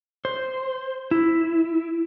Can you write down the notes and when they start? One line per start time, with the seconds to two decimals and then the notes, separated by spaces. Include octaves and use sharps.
0.25 C5
1.11 E4